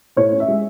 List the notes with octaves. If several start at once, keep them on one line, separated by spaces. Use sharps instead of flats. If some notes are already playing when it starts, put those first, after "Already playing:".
A2 C#5
C#4
E5
G#3